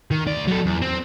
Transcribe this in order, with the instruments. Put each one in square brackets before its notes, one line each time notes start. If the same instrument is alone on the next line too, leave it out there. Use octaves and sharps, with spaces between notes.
[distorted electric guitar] D#3
D2 D5
F#3 A4
E2
C4